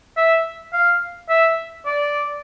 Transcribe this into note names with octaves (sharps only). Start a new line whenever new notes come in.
E5
F5
E5
D5